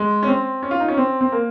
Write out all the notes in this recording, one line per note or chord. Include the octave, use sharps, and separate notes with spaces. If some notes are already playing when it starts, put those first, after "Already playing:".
Already playing: G#3
C#4
C4
C#4
F4
D#4
C#4
C4
C4
A#3